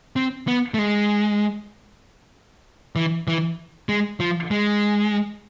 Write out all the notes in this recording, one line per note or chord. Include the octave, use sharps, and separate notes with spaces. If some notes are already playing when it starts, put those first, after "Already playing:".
C4
B3
A3
G#3
E3
E3
G#3
F3
G#3